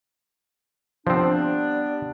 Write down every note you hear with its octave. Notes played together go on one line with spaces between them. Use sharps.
F3 G3 B3 C4 D4